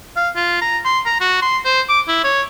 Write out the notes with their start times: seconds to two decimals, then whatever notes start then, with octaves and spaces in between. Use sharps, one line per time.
0.16 F5
0.36 F4
0.61 A#5
0.85 C6
1.06 A#5
1.21 F#4
1.42 C6
1.65 C5
1.89 D6
2.08 E4
2.24 C#5